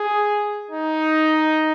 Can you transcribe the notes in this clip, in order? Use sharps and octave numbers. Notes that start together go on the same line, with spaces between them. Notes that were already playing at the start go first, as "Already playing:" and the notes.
Already playing: G#4
D#4